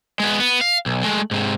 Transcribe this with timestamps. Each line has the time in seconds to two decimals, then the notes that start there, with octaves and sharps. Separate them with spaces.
0.20 G#3 B3
0.40 B3
0.61 F5
0.86 B1
1.03 G#3 A3
1.31 G#2 C3